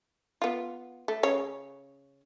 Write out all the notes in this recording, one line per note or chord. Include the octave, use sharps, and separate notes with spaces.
B3 F4
A3
C#3 C#5